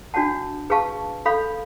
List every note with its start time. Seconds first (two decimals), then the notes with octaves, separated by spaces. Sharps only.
0.14 D4 F#4 C#5 F#5 A5
0.70 G#4 B4 F5 A5 C#6
1.25 A4 C#5 F5 B5